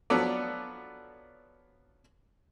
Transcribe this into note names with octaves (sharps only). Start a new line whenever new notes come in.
F3 F#3 B3 D4 A4 D5